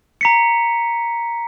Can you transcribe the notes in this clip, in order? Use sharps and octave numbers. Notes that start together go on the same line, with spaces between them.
A#5 B6 C#7